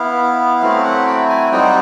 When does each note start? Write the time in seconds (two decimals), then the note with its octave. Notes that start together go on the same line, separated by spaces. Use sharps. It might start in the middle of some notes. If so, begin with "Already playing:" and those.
Already playing: B3 E4 F5
0.62 F#3 A3 C4 E4 F5
0.84 F#5
1.07 G5
1.29 G#5
1.51 G3 C4 D#4 F#4 G5